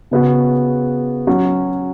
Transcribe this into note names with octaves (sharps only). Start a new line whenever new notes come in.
C#3 B3 F#4
F#3 C#4 F#4